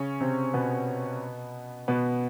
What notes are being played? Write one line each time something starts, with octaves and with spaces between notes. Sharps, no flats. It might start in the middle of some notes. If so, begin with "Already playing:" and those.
Already playing: C#3 C#4
C3 C4
B2 B3
B2 B3